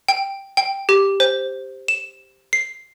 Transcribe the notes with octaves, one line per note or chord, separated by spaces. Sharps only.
G5
G5
G4
C5
E7
C7